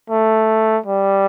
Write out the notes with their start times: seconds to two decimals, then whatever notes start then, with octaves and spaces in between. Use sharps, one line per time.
0.10 A3
0.86 G3